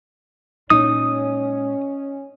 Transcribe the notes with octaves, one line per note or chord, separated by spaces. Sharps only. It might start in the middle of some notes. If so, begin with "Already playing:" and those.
A#2 G#3 C#4 D#4 D#6